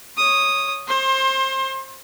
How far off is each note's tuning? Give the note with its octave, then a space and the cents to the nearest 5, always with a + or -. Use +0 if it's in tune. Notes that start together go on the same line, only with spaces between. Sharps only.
C#5 +0 D#6 -5
C5 +25 C6 +35